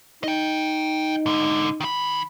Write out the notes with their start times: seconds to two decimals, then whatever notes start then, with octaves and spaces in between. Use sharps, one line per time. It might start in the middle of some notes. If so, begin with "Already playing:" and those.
0.24 D#4 D#5 G5
1.26 G#2 D3
1.80 D#3 B5